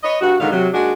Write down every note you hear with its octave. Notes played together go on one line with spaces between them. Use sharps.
B4 C#5 D#5
G2 F#4
G#2 B2 D3 D#3 F5
C3 F#3
D#2 G#3 D4 F#4 G#4